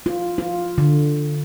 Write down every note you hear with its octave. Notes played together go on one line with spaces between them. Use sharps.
F4
F4
D3